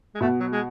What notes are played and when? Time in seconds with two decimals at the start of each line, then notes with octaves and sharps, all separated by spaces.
0.15 G#3
0.21 B2 A3
0.40 F#3
0.52 G#3